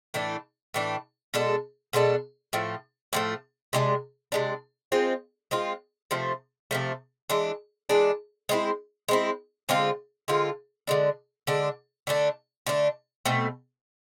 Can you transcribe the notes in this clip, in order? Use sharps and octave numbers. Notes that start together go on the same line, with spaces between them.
A2 E3 A3 D4
A2 E3 A3 D4
B2 G#3 D4 A4
B2 G#3 D4 A4
A2 F3 A3
A2 F3 A3
C3 G#3 D4
C3 G#3 D4
G#3 C4 F4
G#3 C4 F4
C3 F3 A3
C3 F3 A3
E3 G#3 D4
E3 G#3 D4
G#3 C4 E4
G#3 C4 E4
D3 G#3 C4 F4
D3 G#3 C4 F4
D3 G#3 D4
D3 G#3 D4
D3 A3 D4
D3 A3 D4
B2 A3 C4